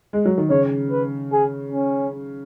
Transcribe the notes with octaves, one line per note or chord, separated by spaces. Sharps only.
G#3
F#3
D#3
C#3 C#5
B4
G#4
C#4